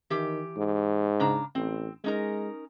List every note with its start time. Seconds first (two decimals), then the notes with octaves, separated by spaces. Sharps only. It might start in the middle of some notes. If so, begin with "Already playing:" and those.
0.10 D#3 E3 G4
0.57 G#2
1.20 C#3 D4 A#5
1.55 A1 C4
2.04 G#3 C#4 D#4 A#4